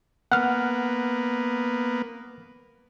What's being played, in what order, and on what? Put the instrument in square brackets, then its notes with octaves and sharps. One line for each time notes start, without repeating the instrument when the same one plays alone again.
[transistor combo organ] A#3 B3 [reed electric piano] F#5 F6